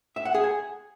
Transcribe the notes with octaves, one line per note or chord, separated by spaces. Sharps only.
E5
F#5
G#4
G#5